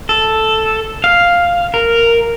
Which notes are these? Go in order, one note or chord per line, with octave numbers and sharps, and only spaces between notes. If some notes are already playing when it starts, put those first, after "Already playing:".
A4
F5
A#4